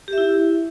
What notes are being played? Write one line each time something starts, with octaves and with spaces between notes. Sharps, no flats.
E4 G4 E5